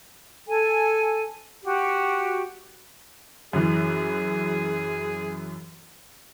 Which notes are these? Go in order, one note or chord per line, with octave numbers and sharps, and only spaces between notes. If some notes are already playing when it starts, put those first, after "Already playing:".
A4 G#5
F#4 G4
F#2 E3 G#4